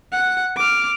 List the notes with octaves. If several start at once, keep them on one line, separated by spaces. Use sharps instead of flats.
F#5
D6 F6